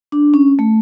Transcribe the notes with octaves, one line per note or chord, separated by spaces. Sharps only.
D4
C#4
A3